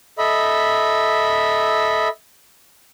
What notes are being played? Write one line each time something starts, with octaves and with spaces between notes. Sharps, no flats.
A4 D#5 E5 B5